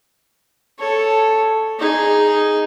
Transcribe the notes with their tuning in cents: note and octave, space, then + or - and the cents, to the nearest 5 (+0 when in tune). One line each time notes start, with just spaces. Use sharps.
A4 +0 C#5 +0
D#4 +0 G#4 +0